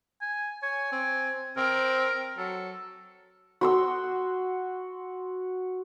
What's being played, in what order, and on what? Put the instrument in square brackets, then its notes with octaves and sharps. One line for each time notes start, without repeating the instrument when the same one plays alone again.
[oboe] G#5
[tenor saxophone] C#5 [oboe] G#5
[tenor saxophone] C4
[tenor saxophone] C4 [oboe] A#4
[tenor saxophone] F#3 [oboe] A4
[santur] F#4 C6 E6